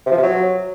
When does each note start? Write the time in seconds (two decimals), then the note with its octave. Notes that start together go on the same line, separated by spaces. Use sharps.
0.06 C3
0.12 F3
0.17 C3
0.23 F#3